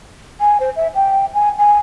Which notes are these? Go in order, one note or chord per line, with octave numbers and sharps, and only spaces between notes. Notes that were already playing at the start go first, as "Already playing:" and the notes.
G#5
C5
E5
G5
G#5
G#5